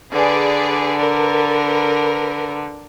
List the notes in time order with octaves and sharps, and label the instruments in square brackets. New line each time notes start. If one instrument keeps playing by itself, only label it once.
[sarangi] D3 [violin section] G#4 B4 D5
[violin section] A#4 B4